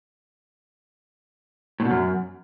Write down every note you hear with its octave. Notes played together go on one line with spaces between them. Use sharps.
A2
B2
F#2